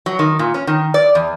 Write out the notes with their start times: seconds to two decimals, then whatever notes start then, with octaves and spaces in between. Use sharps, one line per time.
0.06 F#3
0.19 D#3
0.39 A#2
0.54 C#4
0.67 D#3
0.94 D5
1.15 E2